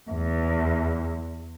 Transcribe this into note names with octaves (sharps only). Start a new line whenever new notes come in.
E2